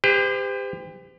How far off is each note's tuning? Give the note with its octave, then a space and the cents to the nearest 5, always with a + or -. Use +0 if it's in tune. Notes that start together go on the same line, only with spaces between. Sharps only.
G4 +30 C5 -45